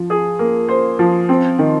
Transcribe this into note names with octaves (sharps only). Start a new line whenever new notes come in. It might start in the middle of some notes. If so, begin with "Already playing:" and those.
Already playing: F3
G#4
A#3
C5
F3
C4
D#3